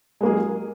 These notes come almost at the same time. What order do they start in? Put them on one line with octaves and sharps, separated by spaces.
G#3 A#3 G#4 F#3